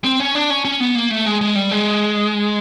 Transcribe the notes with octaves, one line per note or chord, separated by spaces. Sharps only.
C4
C#4
D4
C#4
C#4
B3
A#3
A3
G#3
G#3
G3
G#3